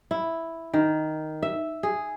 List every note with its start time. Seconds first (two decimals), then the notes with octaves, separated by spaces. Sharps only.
0.11 E4
0.73 D#3
1.43 E5
1.83 G#4